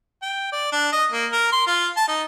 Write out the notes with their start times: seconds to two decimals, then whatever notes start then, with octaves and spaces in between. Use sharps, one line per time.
0.22 G5
0.52 D5
0.72 D4
0.92 D#5
1.12 A#3
1.32 A#4
1.52 C6
1.67 F4
1.97 A5
2.08 D#4